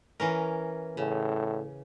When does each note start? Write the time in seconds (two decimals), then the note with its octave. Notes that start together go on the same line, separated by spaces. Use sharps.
0.20 E3 C#4 A#4
0.97 A2 C#3